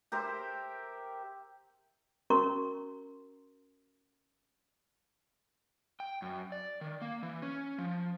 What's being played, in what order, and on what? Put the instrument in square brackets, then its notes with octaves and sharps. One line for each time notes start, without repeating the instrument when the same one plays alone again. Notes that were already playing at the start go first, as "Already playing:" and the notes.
[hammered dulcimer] G4 A#4 C5 E5
[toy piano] C#4 F#4 A#4 A#5 C6 C#6
[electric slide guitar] G5
F#2
D5
D#3
A#3
E3
C#4
F3